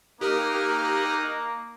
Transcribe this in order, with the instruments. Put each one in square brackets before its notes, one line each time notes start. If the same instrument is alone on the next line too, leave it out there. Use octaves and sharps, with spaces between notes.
[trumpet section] A#3 [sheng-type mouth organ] D#4 D#6 F#6 [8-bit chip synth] G4 A#4 F6